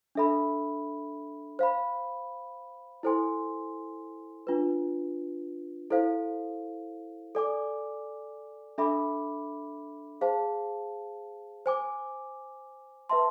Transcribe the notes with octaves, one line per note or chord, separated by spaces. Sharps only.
D4 A4 E5 B5
C5 F5 B5
E4 A4 C5 G#5 C6
D4 F4 B4
E4 A4 C5 F5
A4 D5 G#5 D6
D4 A4 E5 B5 D6
G#4 C5 F5 A5
C5 G#5 D6
B4 E5 A5 C6